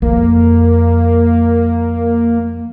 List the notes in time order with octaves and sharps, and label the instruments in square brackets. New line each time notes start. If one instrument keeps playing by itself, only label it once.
[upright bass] F2 [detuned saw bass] A#3